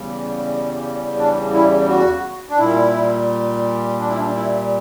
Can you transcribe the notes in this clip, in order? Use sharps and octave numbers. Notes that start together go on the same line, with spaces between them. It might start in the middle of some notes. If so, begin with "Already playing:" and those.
Already playing: E2 C#3 G3
D4
E4
F#4
D4
A#2 G3 E4
D4
E4
D4
E4